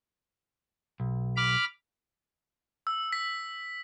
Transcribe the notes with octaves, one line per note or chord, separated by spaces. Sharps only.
B1
B5 D6 F6
E6
B6